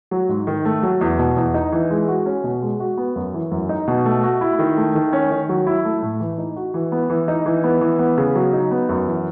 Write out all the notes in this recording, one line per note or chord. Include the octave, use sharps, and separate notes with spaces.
F#3
G#2
D#3
A3
F#3
E2
B2
E2
D#4
E3
G#3
F#4
C#4
B2
G#3
F#4
B3
F#2
E3
F#2
D#4
B2
A3
F#4
E4
D#3
A3
D#3
C#4
D#3
F#3
E4
A3
A2
E3
D#4
F#4
E3
B3
E3
D#4
E3
B3
E3
B3
C#3
F#3
D#4
B3
F#2
E3